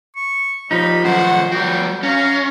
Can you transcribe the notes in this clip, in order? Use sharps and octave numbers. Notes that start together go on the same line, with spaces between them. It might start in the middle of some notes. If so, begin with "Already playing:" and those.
C#6
D#2 F3 G3 D#4 B5
F#2 D#3 C5 F#5
G3 B3 F#4 G5
F#2 C#4 F5 A#5